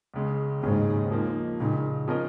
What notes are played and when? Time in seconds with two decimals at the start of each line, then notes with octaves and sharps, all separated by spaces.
0.14 C#2 C#3 G#3
0.62 D#2 G#2 C#3 G#3 C#4 G#4
1.11 F3 A#3 D#4
1.59 C#2 A#2 C#3 G#3 D#4
2.08 F3 C#4 A#4 D#5